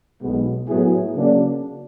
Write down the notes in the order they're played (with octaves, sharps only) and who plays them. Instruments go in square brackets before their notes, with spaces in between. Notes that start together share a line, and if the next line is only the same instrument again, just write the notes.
[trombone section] B1 B2 G#3 B3
A2 F#3 B3 E4 G#4
C#3 F#3 A#3 D4